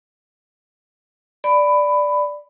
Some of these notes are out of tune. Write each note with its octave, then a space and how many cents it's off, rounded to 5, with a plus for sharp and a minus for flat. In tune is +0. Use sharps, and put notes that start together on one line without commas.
D5 +0 B5 +15